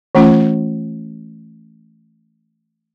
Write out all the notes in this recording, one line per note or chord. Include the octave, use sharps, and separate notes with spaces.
E3 A3 C#4 F4